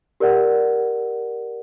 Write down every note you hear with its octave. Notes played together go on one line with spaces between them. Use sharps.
G4 A#4 D5 F#5